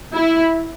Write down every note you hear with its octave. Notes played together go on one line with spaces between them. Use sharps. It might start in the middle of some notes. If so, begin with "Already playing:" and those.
E4